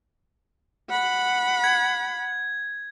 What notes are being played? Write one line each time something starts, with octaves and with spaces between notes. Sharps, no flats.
F#5 B5
G#6